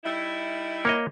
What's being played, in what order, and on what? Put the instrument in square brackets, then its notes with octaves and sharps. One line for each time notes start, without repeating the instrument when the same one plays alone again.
[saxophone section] G3 D#4 E4
[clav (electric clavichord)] A#3 C#5 D#5